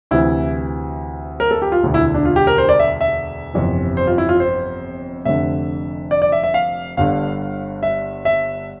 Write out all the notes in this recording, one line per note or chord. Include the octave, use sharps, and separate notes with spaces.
D2 C3 E3 E4
A#4
A4
G4
F4
E1 D2 D3
E4
D4
F4
G4
A#4
C5
D5
E5
E5
G1 F2 C3 E3
C5
F4
E4
F4
C5
F1 F2 D3 E5
D5
D5
E5
E5
F5
G1 G2 D3 F5
E5
E5